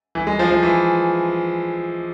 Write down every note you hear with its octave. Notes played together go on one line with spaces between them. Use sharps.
E3
G#3
F3
F3
E3